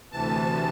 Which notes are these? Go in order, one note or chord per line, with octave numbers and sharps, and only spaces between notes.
D2 C3 E3 A5